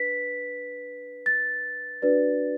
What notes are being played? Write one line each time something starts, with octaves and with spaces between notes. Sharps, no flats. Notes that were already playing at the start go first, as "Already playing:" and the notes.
Already playing: D4 B4 B6
A6
D4 F#4 B4 D5